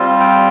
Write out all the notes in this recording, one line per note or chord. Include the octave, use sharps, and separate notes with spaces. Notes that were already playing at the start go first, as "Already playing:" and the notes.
Already playing: G3 C4 F4
G5